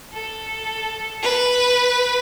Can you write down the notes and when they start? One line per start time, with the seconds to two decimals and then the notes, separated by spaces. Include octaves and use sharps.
0.13 A4
1.23 B4